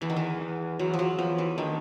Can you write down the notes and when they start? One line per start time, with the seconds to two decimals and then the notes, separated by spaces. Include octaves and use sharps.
0.02 E2 E3
0.10 D#3
0.16 E3
0.41 E2
0.79 E2 F#3
0.94 F3
0.99 F#3
1.18 E2 F3
1.38 E3
1.58 D3 D#3